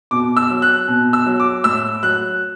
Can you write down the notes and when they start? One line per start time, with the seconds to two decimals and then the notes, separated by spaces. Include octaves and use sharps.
0.11 B2 D6
0.37 E6
0.50 F#3
0.62 F#6
0.88 B2
1.13 E6
1.26 F#3
1.40 D6
1.64 A2 E6
2.03 F#3 F#6